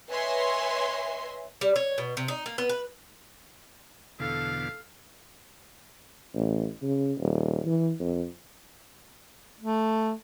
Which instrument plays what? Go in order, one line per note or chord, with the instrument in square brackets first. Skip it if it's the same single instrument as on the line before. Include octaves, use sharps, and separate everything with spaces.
[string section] B4 C#5 D#5 E5 G#5 C6
[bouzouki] G3
C#5
B2
C3
D#4
A#3
B3
B4
[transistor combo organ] E2 B2 D3 [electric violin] A4 F5
[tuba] A1
C#3
D#1
E3
F2
[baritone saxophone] A3